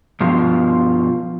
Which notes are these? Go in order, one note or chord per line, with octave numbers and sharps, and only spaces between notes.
G2 B2 F3 F4